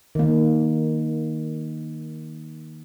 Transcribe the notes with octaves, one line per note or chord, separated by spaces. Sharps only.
D#3 A#3